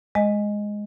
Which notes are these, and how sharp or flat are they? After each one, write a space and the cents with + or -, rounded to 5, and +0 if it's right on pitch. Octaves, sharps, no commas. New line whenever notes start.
G#3 +0 D#5 +0 G#5 +0